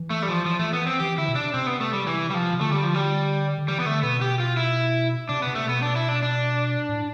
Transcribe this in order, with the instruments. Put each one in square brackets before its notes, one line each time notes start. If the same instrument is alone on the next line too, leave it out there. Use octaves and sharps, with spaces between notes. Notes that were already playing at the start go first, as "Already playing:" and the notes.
Already playing: [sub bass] E3
[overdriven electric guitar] A3
G3
F3
F3
A3
B3
C4
[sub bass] E3 [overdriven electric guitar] G4
[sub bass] D3 [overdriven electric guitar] E4
[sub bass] B2
[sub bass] C3 [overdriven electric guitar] D4
[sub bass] C3 [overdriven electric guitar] C4
[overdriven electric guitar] B3
A3
G3
E3
G3
F3
[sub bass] C3
[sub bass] D3 [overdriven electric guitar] A3
[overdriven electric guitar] G3
F3
G3
[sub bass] D3
[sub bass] E3 [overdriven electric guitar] G3
[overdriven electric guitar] B3
[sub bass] D3 [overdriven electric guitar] A3
[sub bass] B2 [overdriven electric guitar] B3
[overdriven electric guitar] G4
F4
E4
[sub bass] C3 [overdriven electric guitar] D4
[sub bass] C3 [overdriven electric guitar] B3
[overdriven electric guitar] A3
[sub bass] B2 [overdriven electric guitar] B3
[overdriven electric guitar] D4
E4
D4
D4
[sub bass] A2